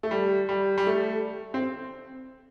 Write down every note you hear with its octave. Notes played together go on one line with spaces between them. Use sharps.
A3
G3
G3
G3
A3
C4